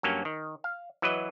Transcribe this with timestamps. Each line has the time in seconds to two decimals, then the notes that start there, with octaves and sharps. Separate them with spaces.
0.03 G2 F#3 A#3 C#4
0.25 D#3
0.64 F5
1.02 E3 F#3 B4 D#5